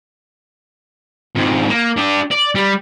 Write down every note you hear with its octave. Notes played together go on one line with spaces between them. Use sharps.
F2 G#2
A#3
D4 G4
D5
G3